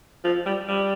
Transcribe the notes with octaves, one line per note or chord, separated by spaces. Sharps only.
F3
G3
G3